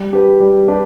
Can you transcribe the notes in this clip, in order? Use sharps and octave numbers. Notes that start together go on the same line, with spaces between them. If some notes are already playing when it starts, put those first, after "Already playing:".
Already playing: G3
D4 G4 B4
G3
D4 G4 B4